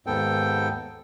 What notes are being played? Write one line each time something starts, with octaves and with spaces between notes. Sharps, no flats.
D#2 G#2 B3 A4 G5